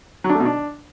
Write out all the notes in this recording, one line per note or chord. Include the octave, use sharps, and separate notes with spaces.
F#3
D4
A3
B2
D4